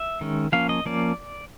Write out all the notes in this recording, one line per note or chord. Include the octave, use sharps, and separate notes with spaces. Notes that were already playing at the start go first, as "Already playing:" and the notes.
Already playing: E5
D#3 G#3 C#4
F3 A#3 C#4 F5
D#5
F3 A#3 C#4 D5